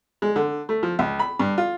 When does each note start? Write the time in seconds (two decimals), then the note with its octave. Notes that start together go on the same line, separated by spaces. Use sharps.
0.22 G#3
0.36 D3
0.69 A3
0.83 F3
0.99 C#2
1.19 B5
1.39 G2
1.58 F4